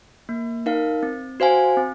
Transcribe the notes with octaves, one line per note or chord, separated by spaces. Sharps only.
A#3
D#4 A#4 F5
C4
F#4 C5 F5 G#5
C4